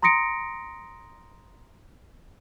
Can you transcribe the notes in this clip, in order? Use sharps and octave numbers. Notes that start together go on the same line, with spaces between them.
A#5 C6 D#6 A#6 C#7 D7